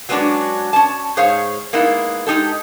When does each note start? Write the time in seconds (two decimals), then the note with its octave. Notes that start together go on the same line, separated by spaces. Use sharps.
0.09 F#3 G#3 B3 C#4 D4 F#4
0.73 C#4 A5
1.17 G#2 G#4 C5 C#5 F5
1.73 G#3 A#3 B3 D#4 E4
2.27 G#3 D#4 G4 A4